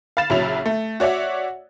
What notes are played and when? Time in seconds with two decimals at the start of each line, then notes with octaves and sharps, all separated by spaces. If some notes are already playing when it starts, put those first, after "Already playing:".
0.17 F5 B5 A6 E7
0.30 A#1 C#3 F#3 C#4 E4 F7
0.66 A3
1.00 F#4 C#5 D5 E5 F#5